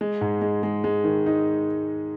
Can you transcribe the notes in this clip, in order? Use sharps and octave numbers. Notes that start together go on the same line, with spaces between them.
G#3
G#2
G#3
G#3
G#3
D#3
D#4